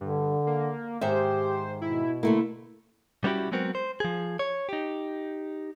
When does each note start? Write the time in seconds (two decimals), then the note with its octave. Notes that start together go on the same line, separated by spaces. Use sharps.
0.01 G2 D3
0.47 A#3
1.01 G#2 D#3 G4 C5 E5
1.82 B2 E4
2.23 D3 A3 A#3 E4
3.24 G3 B3 C#4 E4 F#4 G4
3.52 F#3 G#3 B3 C4 F#4 A#4
3.75 C5
4.00 F3 G#4
4.39 C#5
4.69 D#4 G4